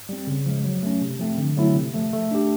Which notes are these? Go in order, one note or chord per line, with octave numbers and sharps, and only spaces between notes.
G3 C4
C#3
F3 G#3
F#3
A3 C#4
C3
F3 A3 C4
D3
F#3 A3 C4 E4
C3
F3 A3
A3
D4 G4